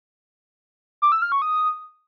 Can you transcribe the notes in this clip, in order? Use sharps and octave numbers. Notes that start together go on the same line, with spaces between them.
D6
E6
F6
C#6
D#6